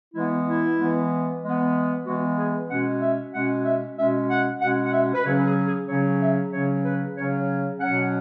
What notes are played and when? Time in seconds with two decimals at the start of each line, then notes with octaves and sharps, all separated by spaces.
0.14 E3 G#3 B3 E4
0.47 E4
0.78 E3 G#3 B3
1.42 E3 G#3 B3
2.06 E3 G#3 B3 F#4
2.38 G#4
2.70 B2 G#3 C#4 F#5
3.01 E5
3.33 B2 G#3 C#4 F#5
3.65 E5
3.97 B2 G#3 C#4 E5
4.29 F#5
4.61 B2 G#3 C#4 F#5
4.85 F#5
4.92 E5
5.14 B4
5.25 C#3 F#3 C#4 C#5
5.46 G#4
5.67 G#4
5.88 C#3 F#3 C#4 C#5
6.21 E5
6.52 C#3 F#3 C#4 C#5
6.84 B4
7.16 C#3 F#3 C#4 C#5
7.79 B2 F#3 C#4 F#5